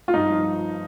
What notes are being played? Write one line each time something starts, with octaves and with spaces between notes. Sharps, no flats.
F4
G2 D#4
F3